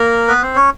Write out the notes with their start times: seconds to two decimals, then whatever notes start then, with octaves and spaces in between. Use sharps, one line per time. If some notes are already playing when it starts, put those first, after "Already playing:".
Already playing: A#3 A#4
0.28 B3 B4
0.43 C4 C5
0.56 C#4 C#5